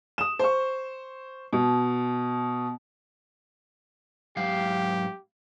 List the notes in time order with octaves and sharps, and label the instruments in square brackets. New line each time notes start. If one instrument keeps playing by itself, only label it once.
[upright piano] D#6 E7
C5 C#6
B2
[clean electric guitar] G#2 F#3 F5 [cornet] G4